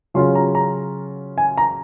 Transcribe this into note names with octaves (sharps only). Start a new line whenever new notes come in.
C#3 F#3 C#4 F4 C6
A#5
A#5
G#5
A#5